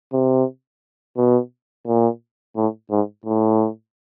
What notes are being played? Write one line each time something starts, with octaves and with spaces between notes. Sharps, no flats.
C3
B2
A#2
A2
G#2
A2